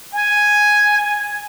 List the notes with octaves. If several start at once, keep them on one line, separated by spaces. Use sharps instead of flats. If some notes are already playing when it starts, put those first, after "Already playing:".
G#5